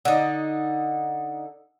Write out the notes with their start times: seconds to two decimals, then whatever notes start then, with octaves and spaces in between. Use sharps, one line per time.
0.05 D3 D#4